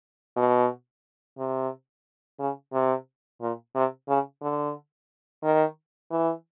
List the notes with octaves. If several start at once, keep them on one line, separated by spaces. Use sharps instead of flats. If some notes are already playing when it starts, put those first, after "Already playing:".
B2
C3
C#3
C3
A#2
C3
C#3
D3
D#3
E3